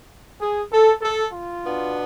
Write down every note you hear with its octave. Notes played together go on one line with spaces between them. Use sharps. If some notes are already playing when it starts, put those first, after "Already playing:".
G#4
A4
A4
F4
B2 B3 D4